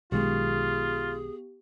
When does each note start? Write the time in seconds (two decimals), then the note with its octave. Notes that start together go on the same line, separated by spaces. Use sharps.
0.12 B1 D#3 G#3 B3 F4 G4 G#4